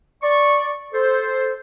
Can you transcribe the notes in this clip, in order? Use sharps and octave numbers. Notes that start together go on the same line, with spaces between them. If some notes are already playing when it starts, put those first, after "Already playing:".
D5 C#6
A4 C5